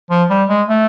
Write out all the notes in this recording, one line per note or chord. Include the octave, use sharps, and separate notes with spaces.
F3
G3
G#3
A3